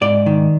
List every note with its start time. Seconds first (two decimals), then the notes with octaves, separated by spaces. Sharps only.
0.01 G#2 D5
0.26 D#3